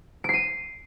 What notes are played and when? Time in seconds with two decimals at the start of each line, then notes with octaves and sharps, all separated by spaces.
0.24 D7
0.29 C7
0.34 D#7